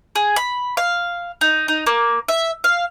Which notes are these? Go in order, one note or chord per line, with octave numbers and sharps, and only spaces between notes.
G#4
B5
F5
D#4
D#4
A#3
E5
F5